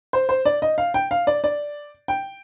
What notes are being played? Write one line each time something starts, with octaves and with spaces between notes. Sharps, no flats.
C5
C5
D5
D#5
F5
G5
F5
D5
D5
G5